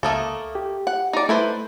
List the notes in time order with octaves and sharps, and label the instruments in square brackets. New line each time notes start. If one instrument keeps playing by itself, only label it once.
[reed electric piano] C#2 D#6 [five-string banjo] A3 A#3 A4
[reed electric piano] G4
[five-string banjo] F#5
D#4 D5
[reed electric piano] A3 [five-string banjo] E4 B4 C5